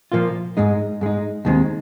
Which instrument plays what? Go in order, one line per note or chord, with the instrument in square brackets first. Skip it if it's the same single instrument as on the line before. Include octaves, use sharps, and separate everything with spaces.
[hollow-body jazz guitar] A#2 F3 A#3 F4
G#2 G#3 D#4
G#2 G#3 D#4
D#2 D#3 G#3 C4